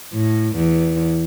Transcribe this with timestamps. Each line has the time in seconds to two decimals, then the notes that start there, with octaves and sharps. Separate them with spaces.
0.13 A2
0.56 E2